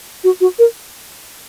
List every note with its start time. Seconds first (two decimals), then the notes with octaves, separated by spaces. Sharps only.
0.24 F#4
0.41 F#4
0.59 A#4